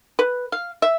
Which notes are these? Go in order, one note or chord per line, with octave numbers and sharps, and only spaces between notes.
B4
F5
E5